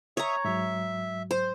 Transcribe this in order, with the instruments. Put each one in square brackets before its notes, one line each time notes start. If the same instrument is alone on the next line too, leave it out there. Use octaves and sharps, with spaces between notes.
[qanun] C#5 A#5 [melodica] E5 C#6 D#6
[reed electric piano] G#2 F#3 [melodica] E5
[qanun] C5